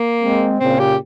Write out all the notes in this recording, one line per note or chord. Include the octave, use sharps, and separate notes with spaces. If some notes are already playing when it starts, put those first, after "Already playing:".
Already playing: A#3
G#3 C4
A#2 C#3 C4
G4